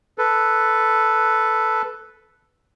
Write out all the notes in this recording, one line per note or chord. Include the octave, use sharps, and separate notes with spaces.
A4 B4